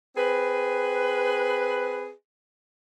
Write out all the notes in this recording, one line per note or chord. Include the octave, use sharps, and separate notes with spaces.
C4 G#4 B4